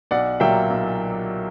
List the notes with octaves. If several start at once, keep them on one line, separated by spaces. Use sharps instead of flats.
B1 D5 F#5
A#2 F#3 A#3 E5 G5
B1